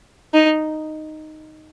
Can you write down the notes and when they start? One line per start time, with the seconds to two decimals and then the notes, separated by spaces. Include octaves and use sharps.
0.34 D#4